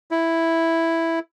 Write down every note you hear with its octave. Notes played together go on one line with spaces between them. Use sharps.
E4